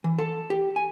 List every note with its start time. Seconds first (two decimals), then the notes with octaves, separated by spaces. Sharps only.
0.04 E3
0.19 A4
0.50 G4
0.76 G#5